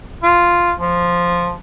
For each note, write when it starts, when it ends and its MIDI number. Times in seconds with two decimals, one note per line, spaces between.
0.23 0.73 65
0.80 1.54 53